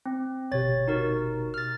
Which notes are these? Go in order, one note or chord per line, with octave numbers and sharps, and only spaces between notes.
C4
G1 B2 G4 C#5 A6
D#4 F#4 A#4
F6 A6